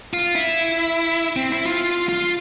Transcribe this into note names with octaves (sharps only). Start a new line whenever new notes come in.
F4
E4
C4
E4
F4
F4